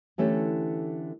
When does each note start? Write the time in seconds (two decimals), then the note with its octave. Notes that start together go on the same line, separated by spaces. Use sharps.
0.18 D3 E3 A3 C#4 G4 A4